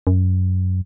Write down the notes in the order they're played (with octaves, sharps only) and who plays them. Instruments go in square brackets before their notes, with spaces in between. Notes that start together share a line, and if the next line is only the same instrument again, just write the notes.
[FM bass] F#2